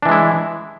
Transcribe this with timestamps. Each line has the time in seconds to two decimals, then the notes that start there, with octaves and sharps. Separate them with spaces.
0.02 D4
0.05 E3
0.08 G#3
0.11 E4